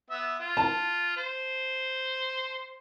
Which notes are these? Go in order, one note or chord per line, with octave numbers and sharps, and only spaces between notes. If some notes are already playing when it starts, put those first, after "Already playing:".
B3 E5
F4
A5
C5